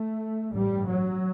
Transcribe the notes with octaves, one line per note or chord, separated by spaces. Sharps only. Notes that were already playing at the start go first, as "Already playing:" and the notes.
Already playing: A3
A1 G2 G3
F#3